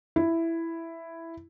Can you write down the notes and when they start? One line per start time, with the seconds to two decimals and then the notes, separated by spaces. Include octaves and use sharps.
0.16 E4